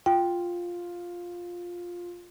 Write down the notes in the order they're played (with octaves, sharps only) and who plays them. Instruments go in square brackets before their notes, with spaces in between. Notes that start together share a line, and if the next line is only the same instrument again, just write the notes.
[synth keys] F4 [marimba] G5